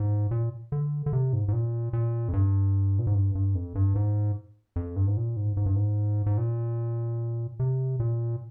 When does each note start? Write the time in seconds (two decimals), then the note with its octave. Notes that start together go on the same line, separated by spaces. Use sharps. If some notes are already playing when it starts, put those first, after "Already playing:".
Already playing: G#2
0.31 A#2
0.72 D3
1.06 D3
1.13 C3
1.33 G#2
1.48 G#2
1.53 A#2
1.93 A#2
2.28 F2
2.33 G2
2.99 A#2
3.07 G#2
3.14 G2
3.35 G2
3.55 F2
3.75 G2
3.95 G#2
4.76 F2
4.96 G2
5.07 G#2
5.17 A#2
5.37 G#2
5.57 G#2
5.66 G2
5.76 G#2
6.26 G#2
6.38 A#2
7.59 C3
8.00 A#2